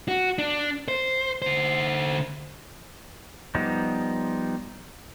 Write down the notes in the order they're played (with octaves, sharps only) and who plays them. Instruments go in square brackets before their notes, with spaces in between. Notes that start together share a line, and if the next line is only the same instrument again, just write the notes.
[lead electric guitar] F#4
D4
C5
D3 C5
[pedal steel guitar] F3 G3 B3 D#4